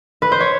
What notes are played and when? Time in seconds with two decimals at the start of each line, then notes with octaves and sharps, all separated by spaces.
0.22 B4
0.32 C5
0.40 C#5